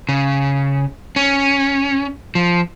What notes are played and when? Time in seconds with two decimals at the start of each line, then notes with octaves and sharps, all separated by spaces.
0.09 C#3
1.16 C#4
2.35 F3